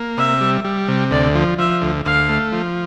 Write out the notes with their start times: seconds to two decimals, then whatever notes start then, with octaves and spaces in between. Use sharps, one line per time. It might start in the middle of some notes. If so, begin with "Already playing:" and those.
Already playing: A#3
0.17 C3 E5
0.41 G3
0.64 G3
0.88 C3
1.11 D2 D5
1.35 F3
1.58 F3 E5
1.82 D2
2.05 D2 F5
2.29 A3
2.52 F3